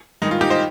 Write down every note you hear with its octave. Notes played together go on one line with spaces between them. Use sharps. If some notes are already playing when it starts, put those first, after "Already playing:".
G2 D#3 G#3 D#4
F4
D#4 G4
C5 D#5